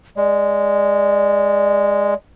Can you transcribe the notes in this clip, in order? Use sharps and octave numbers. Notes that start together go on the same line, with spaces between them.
G#3 D5